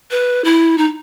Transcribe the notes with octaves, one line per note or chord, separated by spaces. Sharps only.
B4
E4
D#4